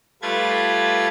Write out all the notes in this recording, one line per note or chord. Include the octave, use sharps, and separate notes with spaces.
G3 A3 F4 B4 G#6 A6